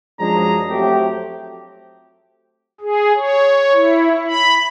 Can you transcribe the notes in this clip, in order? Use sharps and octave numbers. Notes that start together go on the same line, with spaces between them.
F#2 F3 G#3 D4 G#4 A#5
F#3 A3 C4 G4
G#4
C#5
E4
B5